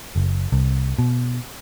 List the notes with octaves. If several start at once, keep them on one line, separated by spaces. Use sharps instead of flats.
F#1
C2
B2